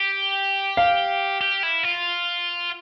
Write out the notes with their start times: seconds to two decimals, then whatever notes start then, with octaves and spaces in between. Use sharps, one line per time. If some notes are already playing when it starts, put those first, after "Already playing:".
Already playing: G4
0.77 F5
1.41 G4
1.63 E4
1.84 F4